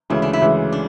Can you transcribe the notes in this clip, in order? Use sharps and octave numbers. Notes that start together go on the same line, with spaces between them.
D2 C#3 E3 G#3 E4
D4
E4
D2 C#3 E3 G#3
D4